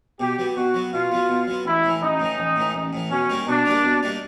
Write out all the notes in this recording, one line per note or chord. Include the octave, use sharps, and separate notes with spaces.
B2 G4
F#3 B3
B2 F#4
F#3 B3
B2 F4
F#3 B3
B2
F#3 B3
A1 E4
A2 E3
A1 D#4
A2 E3
A1
A2 E3
A1
A2 E3
B2 C#4
G3 A#3 D#4
B2 D4
G3 A#3 D#4
B2
G3 A#3 D#4